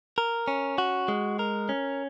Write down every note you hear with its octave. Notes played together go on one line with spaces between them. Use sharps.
A#4
C#4
F#4
G#3
A#4
C#4